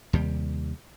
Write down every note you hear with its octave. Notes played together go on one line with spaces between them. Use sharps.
D#2 C3 G3